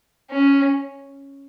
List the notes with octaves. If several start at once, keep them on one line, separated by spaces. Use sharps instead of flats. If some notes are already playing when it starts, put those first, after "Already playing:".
C#4